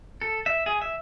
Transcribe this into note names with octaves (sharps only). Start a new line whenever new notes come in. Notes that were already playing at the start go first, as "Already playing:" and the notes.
A4
E5
G#4
E5